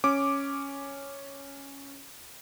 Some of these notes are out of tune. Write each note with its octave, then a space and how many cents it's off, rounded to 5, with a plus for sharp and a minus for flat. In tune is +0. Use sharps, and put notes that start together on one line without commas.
C#4 +0 D6 +0